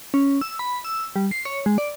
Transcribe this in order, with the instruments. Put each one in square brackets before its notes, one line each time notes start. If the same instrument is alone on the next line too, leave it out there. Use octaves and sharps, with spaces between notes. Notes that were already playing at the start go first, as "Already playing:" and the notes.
[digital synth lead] C#4
E6
B5
E6
G3
C7
C#5
G#3
D5